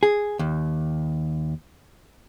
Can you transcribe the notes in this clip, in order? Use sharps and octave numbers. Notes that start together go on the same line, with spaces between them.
G#4
D#2